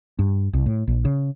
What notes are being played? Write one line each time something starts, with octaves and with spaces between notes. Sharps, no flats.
G2
C2
A2
A#1
C#3